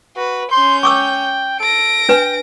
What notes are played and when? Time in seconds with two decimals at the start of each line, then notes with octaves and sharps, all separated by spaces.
0.16 F#4 B4
0.51 C#4 C6 G6
0.83 G5 C#6 D6 E6
1.60 A4 A#6 D7
2.09 D4 B4 G5 G#5